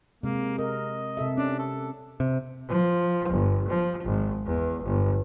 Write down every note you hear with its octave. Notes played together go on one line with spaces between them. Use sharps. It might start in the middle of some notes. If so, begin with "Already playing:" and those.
C3 G#3 A#3
A#4 D#5
C3 A4 E5
C#4 D4
A4
C3
F3
G1
F3
G#1
E2
G1